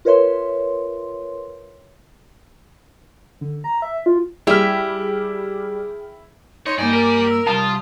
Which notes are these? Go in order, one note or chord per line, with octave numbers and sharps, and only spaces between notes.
F4 A#4 B4 C#5 E5 C6
D3
A#5
E5
F4
G3 E4 G4 G#4 E5 G5 F6
D#4 C#5 C6
G2 A#3 D#4 G4 D5 G#5
A#4
E6
C2 G3 F4 A5 D#6